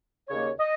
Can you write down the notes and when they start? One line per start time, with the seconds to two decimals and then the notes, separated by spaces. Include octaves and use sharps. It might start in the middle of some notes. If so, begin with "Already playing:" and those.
0.29 D#2 C#3 A#3 D#4 C#5
0.60 D#5